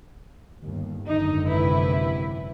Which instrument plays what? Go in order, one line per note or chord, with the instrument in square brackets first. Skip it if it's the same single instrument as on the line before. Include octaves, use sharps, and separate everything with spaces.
[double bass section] G1 D#2
[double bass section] G#1 F#2 D3 [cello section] D#4
[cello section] C3 E4 B4